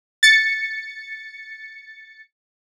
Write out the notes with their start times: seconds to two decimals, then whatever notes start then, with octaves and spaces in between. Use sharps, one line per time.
0.23 A6 C#7